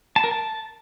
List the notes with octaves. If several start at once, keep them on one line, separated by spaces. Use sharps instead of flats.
A5
A#4
A5